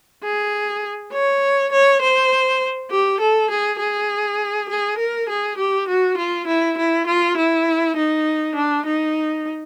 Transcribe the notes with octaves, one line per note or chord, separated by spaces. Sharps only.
G#4
C#5
C#5
C5
G4
A4
G#4
G#4
G#4
A#4
G#4
G4
F#4
F4
E4
E4
F4
E4
D#4
D4
D#4